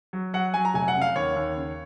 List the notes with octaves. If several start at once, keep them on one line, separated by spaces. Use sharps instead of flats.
F#3
F#3 F#5
F#3 G#5
A#5
F1 G#5
F#5
C#3
F5
D#2 C#5
D#2
C#3